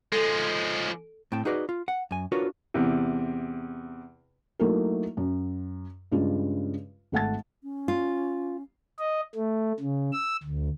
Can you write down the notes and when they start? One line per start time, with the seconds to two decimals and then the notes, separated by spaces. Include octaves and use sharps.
0.12 F3 G#3 A4
1.32 A2 C4 G5 A5
1.45 D#4 F#4 G#4 B4 D5 D#5
1.69 F4
1.88 F#5
2.11 F#2 G#5
2.32 D4 F4 F#4 A#4 B4 C#5
2.74 E2 C3
4.59 F#3 A3 A#3 D#4 E4 A#4
5.17 F#2
6.12 G2 C#3 G#3 F4
7.12 G#1 A3 F#5 A5 A6
7.63 C#4
7.88 F4
8.99 D#5
9.35 A3
9.79 C#3
10.12 E6
10.43 D2